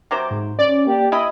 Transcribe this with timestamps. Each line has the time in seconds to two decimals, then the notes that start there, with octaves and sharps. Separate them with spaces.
0.11 C3 F#3 C5 D6
0.31 G#2
0.59 C#4 D5
0.87 A#3 G4
1.12 E4 D#5 B5 D#6